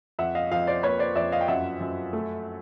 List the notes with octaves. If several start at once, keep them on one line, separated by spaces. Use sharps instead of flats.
F2 E5 F#5
D#5 F5
F2 D#5 F5
C5 D5
A#3 B4 C#5
C5 D5
F2 D5 E5
D#5 F5
G5
F#2 E5 F#5
F#2
A3